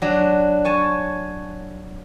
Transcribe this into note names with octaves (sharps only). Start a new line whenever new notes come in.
F#3 D4
C#5 G#5 A5